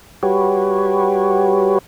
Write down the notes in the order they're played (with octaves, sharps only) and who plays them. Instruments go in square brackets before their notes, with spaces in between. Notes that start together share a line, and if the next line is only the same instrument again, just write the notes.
[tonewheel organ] G3 F#4 G4 B4 C#5